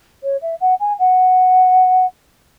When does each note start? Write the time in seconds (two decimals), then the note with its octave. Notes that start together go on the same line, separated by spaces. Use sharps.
0.23 C#5
0.41 E5
0.60 F#5
0.80 G#5
0.99 F#5